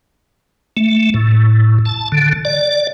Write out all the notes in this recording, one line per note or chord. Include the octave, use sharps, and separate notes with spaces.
A3
A2
A5
D3
D5